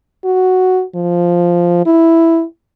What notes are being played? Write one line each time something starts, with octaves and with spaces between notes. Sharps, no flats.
F#4
F3
E4